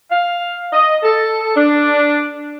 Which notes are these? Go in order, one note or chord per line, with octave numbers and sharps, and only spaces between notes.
F5
D#5
A4
D4